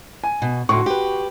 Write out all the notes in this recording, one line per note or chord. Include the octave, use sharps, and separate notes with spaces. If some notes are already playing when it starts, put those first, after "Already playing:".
G#5
B2
A2 D3 F#4 C6 C#6
G4 B4